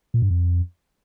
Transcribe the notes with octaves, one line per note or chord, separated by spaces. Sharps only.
A#2
G2
F2